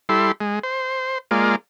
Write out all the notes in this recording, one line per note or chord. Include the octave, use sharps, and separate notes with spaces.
G3 E4 A4 C6
G#3
C5
G#3 A#3 F4 D5